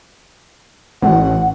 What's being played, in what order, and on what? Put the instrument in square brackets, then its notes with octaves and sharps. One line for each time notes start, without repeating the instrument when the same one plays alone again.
[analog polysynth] A1 [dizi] F#5